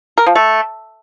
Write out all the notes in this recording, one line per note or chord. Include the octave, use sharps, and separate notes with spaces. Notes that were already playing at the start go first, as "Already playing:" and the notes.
A#4
F3
A3